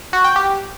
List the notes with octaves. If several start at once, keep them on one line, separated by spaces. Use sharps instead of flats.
F#4
G5
G4